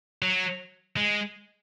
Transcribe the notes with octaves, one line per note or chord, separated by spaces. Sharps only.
F#3
G#3